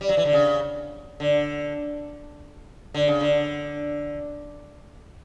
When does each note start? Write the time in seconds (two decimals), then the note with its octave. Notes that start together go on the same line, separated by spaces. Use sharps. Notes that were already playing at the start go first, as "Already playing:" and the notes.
0.01 G3
0.09 F#3
0.17 E3
0.25 D3
0.33 C#3
1.20 D3
2.94 D3
3.08 C#3
3.21 D3